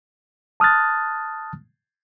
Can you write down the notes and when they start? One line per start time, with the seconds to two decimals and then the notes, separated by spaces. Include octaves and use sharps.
0.60 A5 D#6 F6 F#6 A6